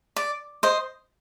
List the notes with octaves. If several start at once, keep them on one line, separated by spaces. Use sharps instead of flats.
D5
C5 D#5